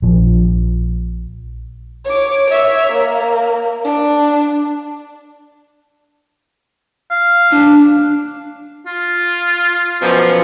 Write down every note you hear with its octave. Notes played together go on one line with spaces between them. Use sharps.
A#1 F3
C#5 D6
C#5 E5
A#3
D4
F5
D4
F4
F#2 B2 F3